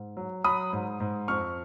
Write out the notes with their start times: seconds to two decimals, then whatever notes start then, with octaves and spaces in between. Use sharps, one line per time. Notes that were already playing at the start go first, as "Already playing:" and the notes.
Already playing: G#2
0.17 F#3
0.44 F#3 B5 D#6
0.73 G#2
1.00 G#2
1.28 F2 C#6 F6